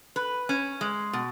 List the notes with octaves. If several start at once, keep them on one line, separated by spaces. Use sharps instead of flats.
B4
C#4
G#3
B2